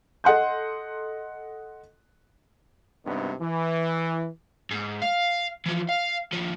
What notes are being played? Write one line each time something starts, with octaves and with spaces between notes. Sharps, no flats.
A4 D#5 F#5 C6 G6
G#1 G2 C3 D#3 B3 D4
E3
G#2
F5
E3 F3
F5
D#2 F3